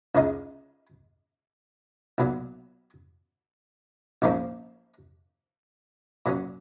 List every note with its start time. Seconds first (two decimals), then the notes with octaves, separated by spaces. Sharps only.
0.15 C#2 C#3 G#3 D#4
2.18 B1 A#2 F#3
4.22 A#1 G#2 F3 A#3 C#4
6.26 A#2 F#3 C#4